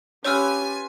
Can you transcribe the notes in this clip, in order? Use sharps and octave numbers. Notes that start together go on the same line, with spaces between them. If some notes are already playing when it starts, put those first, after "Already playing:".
C#4 F4 G4 B4 C#5 G#5 E6 F6